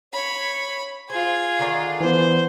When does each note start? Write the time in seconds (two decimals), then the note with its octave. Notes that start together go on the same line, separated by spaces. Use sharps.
0.13 C#5 B5
1.10 F4 G#4 C5 G#6
1.59 D3 D#3 D5
2.01 E3 B3 C5